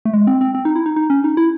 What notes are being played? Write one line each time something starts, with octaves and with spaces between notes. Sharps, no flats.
A3
G#3
C4
C4
C4
D#4
E4
D#4
D#4
C#4
D#4
E4